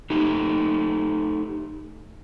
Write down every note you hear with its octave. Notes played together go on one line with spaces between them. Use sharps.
A3 D#4 G4